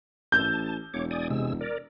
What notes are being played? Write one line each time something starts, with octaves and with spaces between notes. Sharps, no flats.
A1 A5 G6
E1 C#5 D6
D5 G#5 D#6
C3 G#3 E6
A#4 D5